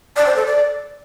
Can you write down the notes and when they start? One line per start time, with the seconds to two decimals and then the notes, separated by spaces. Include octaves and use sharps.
0.17 D5
0.26 C5
0.36 A4
0.46 D5